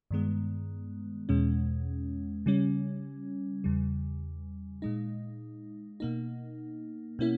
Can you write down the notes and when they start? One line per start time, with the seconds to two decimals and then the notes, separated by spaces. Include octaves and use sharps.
0.11 G2 D#3 G#3 B3
1.29 E2 B2 G#3 C#4
2.46 C#3 G3 C#4
3.64 E2 C#3 G3
4.82 A#2 G#3 D#4
6.00 B2 A#3 D#4
7.19 B2 A#3 C#4 E4